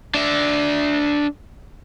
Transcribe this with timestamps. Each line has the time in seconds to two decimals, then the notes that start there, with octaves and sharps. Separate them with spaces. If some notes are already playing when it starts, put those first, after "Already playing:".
0.15 D4 E5